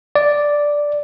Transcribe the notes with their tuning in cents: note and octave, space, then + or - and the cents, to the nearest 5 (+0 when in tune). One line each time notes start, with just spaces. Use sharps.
D5 +0